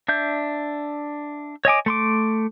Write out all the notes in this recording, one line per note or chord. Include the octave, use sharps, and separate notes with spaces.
D4 E5 G6
C#5 D#5 G#5 D6
A3 C6 D6